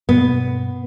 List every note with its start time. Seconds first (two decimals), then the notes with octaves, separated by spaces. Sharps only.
0.09 G2 B2 B3